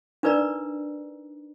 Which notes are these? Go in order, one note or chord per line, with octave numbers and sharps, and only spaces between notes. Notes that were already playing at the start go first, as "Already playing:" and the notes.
D4 D#4 A#4 B4 D5 A#5